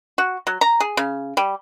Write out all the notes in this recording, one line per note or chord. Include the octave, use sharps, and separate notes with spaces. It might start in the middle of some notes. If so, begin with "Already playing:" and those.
F#4
F#3
A#5
G#4
C#3
G3